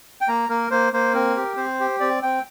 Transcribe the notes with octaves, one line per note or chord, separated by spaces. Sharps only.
G5
A#3 A#5
A#3 A#4
A#3 C5
A#3 C5
C4 A#4
G4
C4 C5
G4
C4 D5
C4 G5